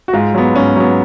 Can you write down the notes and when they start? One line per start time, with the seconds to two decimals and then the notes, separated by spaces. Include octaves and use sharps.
0.08 F#4
0.13 G#2 F4
0.34 F#3 B3
0.56 G#2 C#4
0.76 F#3 B3